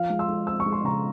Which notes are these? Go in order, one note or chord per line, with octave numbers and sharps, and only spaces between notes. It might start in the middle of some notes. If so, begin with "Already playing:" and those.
Already playing: F3 F5
G#3
C6 E6
G#3
C4 E6
C#6
G#3
C6
C#3 A#5 C#6